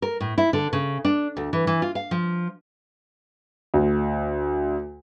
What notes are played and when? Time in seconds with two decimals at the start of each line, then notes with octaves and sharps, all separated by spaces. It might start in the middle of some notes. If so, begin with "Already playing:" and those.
0.02 A#4
0.21 A2
0.38 E4
0.53 D3
0.73 C#3
1.05 D4
1.37 D2
1.53 E3
1.67 E3
1.82 F4
1.95 F5
2.11 F3
3.74 D2